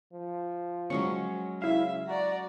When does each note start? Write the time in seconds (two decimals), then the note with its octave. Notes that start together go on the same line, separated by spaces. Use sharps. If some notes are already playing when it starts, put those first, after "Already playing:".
0.13 F3
0.90 F#3 G#3 C#4 C#6
1.62 C#3 E4 E5 F5
2.07 F#4 D5 A#5